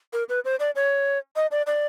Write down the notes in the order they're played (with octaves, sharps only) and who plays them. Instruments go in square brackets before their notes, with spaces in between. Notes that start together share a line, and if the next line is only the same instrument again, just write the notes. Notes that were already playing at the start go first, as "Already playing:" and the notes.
[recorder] A#4
B4
C5
D5
C#5
D#5
D5
D5